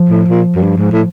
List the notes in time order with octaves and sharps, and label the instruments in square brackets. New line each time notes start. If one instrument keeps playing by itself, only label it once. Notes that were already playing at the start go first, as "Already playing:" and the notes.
Already playing: [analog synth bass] F3
[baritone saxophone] A2
A#2
F#2
G2
G#2
A2